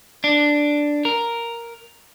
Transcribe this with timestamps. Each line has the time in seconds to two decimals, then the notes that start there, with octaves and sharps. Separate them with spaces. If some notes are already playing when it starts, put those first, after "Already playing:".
0.24 D4
1.05 A#4